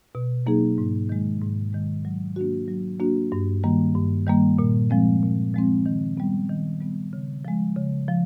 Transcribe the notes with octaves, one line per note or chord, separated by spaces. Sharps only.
B2
F#3 A#3 D#4 G#4
G#2
D#3 G#3
G#2
D#3 G#3
F#3
A#3 D4 F#4
F#3
A#3 D4 F#4
G2
D#3 G3 A#3
G2
D#3 G3 A#3
A#2
F3 G#3 C4
A#2
F3 G#3 C4
D#3
G3 B3
D#3
G3 B3
C#3
F3 G#3
C#3
F3